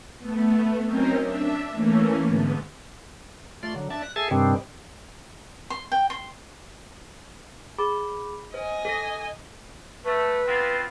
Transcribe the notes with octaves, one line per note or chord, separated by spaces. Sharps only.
A3 B3
F#3 C4 C#4 D#4 A#4 C5
D4 E5
E3 A3 A#3 C#4
G#2 D3 B3
A3 F4 D5 C6
D3 F#3
D4 D5 E5 A5
F#6
G#4 A4 E5 G#5 A5
G2 C3 D#3 G3 C4 D4
C6
G5
C6
G#4 B5 D6
C5 D#5 G#5
A4 A#6
A3 B4
B3 C4 F4